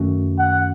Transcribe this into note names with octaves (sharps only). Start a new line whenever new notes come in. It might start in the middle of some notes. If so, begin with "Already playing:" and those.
Already playing: F#2 D#3 A3 C#4 F#4
F#5